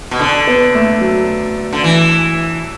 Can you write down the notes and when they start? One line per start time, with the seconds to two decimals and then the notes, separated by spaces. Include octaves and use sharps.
0.11 B2
0.19 D3 D4
0.47 B3
0.75 A3
1.01 F#3
1.73 D3
1.84 E3